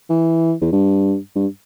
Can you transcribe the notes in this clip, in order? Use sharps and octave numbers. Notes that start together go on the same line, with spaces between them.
E3
E2
G2
G2